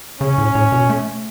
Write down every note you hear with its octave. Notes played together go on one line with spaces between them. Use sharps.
C#3 C#4
A2
A2
B2
A3